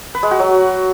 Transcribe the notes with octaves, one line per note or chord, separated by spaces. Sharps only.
B4
G#3
F#4
F#3